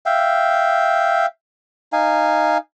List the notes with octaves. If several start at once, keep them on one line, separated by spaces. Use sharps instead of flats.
E5 F5 G5
D#4 F5 G#5